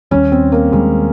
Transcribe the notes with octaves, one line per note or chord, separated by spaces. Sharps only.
D#2 D#3 G3 C#4
C4
A#3
D#2 D#3 G3 G#3